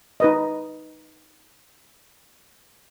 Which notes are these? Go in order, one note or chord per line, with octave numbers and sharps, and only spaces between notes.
D#4 B4 D#5